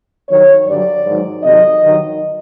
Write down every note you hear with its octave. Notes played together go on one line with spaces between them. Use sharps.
G2 D#3 F#3 C#5
G2 D3 F#3 D5
G#2 D#3 F#3
F2 C3 D#3 F#3 D#5
G2 D#3 F#3